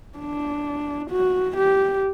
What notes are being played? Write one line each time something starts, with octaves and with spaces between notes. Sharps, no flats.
D4
F#4
G4